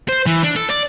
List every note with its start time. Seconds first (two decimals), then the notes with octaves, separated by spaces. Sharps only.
0.09 C5
0.26 E3
0.44 D4
0.56 A4
0.70 D5